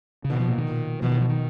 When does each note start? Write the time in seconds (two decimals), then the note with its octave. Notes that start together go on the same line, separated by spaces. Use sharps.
0.25 C#3
0.30 B2 D#3
0.40 F3
0.48 A#2
0.58 D#3
0.67 A#2
1.02 B2 F3
1.11 D#3
1.21 F3
1.29 D#3